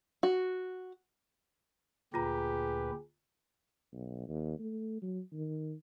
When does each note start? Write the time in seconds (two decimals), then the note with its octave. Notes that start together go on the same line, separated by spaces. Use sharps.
0.23 F#4
2.14 D2 A#2 F4 G4 G#4 B4 A#5
3.93 B1
4.28 D#2
4.59 A3
5.02 F#3
5.33 D#3